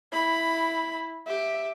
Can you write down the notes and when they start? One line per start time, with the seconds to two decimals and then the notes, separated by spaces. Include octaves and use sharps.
0.12 E4 B5
1.27 G4 E5